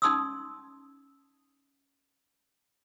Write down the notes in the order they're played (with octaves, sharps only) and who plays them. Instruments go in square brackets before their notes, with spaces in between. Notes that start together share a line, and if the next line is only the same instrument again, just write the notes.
[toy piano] C#4 D#4 A5 C6 D#6 E6